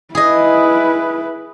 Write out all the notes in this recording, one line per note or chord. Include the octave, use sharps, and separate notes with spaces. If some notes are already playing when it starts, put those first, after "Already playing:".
E4 G#4 B4 D#5